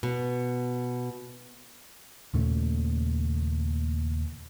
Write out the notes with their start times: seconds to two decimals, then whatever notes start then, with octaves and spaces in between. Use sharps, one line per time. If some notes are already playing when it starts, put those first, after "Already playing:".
0.03 B2
2.34 D#2 A#2 C#3 A3